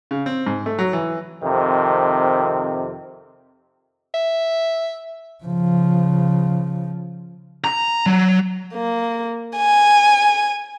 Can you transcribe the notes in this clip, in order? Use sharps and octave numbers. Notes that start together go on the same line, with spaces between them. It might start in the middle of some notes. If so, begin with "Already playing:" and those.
C#3
C4
G#2
A3
F#3
E3
F2 C3 D#3
E5
C#3 F3
A#5
F#3
A#3
G#5